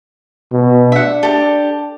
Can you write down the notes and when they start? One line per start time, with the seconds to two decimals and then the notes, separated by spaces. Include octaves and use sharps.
0.52 B2
0.92 D4 E5 F#5
1.23 G4 A4